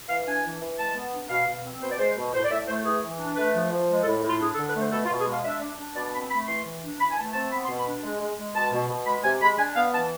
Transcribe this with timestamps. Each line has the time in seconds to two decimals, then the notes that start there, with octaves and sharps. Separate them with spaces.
0.08 E3 F5
0.26 D4 G#5
0.43 E3
0.61 E3
0.77 G#3 A5
0.95 B3
1.12 D4
1.29 B2 F5
1.46 B2
1.64 C4
1.81 B2 C5
1.90 D5
1.98 G#3 C5
2.16 B2
2.33 A2 C5
2.44 D5
2.50 A2 E5
2.67 A3 C5
2.85 E3 G#4
3.03 E3
3.19 D4
3.36 A3 B4
3.54 F3
3.71 F3
3.89 G#3
4.01 A4
4.06 A2
4.23 A2 F4
4.40 D4 G#4
4.53 A4
4.58 D3
4.66 B4
4.75 A3 C5
4.92 B2 A4
5.05 F4
5.10 B2
5.18 G#4
5.26 G#3 F5
5.43 D4 E5
5.61 D4
5.78 D4
5.95 B2 D5
6.13 C4 B5
6.30 A3 B5
6.47 E3 C6
6.65 E3
6.81 D4
6.99 E3 B5
7.10 G#5
7.16 A3 A5
7.33 C4 A5
7.51 B3 B5
7.64 C6
7.68 B2
7.77 B5
7.86 D4
8.03 G#3
8.20 G#3
8.37 G#3
8.54 B2 A5
8.72 B2
8.89 B2
9.06 G#3 B5
9.23 C3 G#5
9.41 G#3 B5
9.58 D4 G#5
9.75 B3 F5
9.93 E3 A5